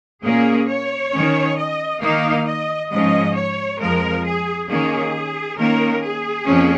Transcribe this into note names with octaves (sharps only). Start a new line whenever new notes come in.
A#2 A#3 C#4 G#4
C#5
D#3 C#4
D#5
D#3 A#3 D#4 F5
D#5
G#2 F3 C#4 D#5
C#5
F2 F3 G#3 A#4
G#4
D#3 A#3 C#4 G#4
D#3 A#3 C#4 A#4
G#4
F2 F3 A#3 C#4